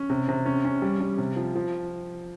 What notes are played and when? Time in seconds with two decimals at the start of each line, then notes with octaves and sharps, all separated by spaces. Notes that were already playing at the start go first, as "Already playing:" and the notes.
Already playing: C#4
0.10 C3
0.29 C3
0.46 C#4
0.65 C#4
0.82 G3
1.01 G3
1.18 C3
1.36 F3
1.56 F3